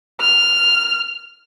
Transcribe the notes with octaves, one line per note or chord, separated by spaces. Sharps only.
F6